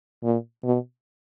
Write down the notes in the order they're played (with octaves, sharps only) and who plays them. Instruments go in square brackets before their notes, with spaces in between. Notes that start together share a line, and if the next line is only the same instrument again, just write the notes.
[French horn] A#2
B2